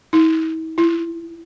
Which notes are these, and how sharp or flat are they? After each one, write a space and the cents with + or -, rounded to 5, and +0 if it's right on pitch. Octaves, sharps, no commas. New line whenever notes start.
E4 -45
E4 +25